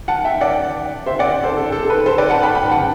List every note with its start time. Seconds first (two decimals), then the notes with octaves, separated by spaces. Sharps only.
0.08 F#5 A5
0.25 E5 G5
0.41 D5 F#5
1.06 C5 E5
1.19 D5 F#5
1.43 A4 C5
1.57 A4
1.72 A4
1.85 A4
1.90 B4
2.06 A4 C5
2.18 B4 D5
2.30 F#5 A5
2.43 G5 B5
2.55 G5 B5
2.71 F#5 A5